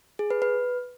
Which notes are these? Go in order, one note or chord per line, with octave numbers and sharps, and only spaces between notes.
G#4
B4
B4